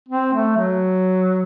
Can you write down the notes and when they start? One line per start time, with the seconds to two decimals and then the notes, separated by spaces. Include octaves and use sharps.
0.09 C4
0.33 A3
0.57 F#3